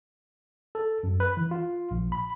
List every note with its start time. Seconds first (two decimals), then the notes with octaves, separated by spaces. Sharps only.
0.75 A4
1.03 F#2
1.20 B4
1.37 E3
1.51 F4
1.91 A#1
2.12 B5